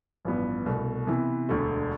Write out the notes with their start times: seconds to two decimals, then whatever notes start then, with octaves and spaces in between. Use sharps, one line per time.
0.25 A1 G2 F3 B3
0.66 C2 B2 A3
1.07 C3 E3 B3
1.49 E1 D2 D3 A3